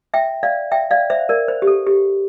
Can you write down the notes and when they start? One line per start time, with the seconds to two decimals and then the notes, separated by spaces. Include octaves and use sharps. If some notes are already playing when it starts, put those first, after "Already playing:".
0.14 E5 G5
0.43 D5 F5
0.72 E5 G5
0.91 D5 F5
1.10 C5 E5
1.29 A#4 D5
1.48 C5
1.62 G4
1.67 A4
1.87 G4